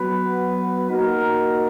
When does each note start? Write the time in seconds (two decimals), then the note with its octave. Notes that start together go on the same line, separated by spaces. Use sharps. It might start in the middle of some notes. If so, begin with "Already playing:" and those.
Already playing: F#3 B3 F#4 B4
0.90 A#3 D#4 F#4 A#4